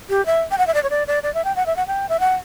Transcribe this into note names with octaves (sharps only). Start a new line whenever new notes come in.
G4
E5
G5
F#5
E5
D5
C#5
D5
D5
D5
E5
G5
F#5
E5
F#5
G5
E5
F#5